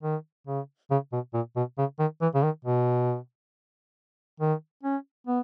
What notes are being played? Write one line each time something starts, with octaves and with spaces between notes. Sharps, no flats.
D#3
C#3
C#3
B2
A#2
B2
C#3
D#3
E3
C#3
D#3
B2
D#3
C#4
B3